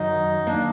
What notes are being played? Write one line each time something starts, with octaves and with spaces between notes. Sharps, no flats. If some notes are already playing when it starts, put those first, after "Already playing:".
Already playing: F#2 D#3 F#3 D#4
D#3 A#3 D4